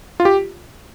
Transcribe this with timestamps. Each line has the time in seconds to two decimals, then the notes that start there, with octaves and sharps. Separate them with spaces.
0.20 F4
0.25 G4